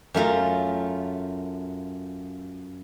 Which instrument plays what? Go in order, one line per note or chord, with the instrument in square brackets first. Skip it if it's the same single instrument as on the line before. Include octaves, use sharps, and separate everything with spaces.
[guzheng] F#2 A3 F4 A#5